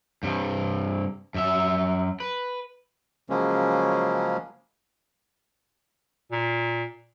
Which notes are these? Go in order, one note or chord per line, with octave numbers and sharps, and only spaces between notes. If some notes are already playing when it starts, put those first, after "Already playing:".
G2 C3
F#2 E5
B4
C#3 F3 F#3 G#3 A#3 C#4
A#2